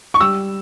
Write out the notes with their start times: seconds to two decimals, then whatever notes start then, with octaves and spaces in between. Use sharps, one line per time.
0.14 C#6
0.20 G3 E6